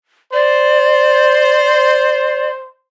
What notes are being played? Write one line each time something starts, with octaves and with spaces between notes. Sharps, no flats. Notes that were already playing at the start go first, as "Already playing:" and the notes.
C5 D5